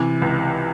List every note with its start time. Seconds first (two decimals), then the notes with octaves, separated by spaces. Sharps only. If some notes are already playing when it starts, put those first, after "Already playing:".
Already playing: C3 E3
0.22 C#2